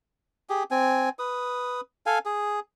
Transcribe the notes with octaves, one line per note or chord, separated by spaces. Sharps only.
G4 G#4
C4 G#5
B4 D#6
A4 F5 G#5
G#4